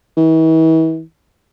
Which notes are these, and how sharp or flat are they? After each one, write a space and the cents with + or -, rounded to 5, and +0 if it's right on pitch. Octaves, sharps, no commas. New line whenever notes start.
E3 -40